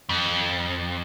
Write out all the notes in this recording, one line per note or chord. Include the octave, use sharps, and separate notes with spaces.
F2